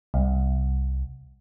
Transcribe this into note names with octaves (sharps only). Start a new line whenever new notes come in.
C2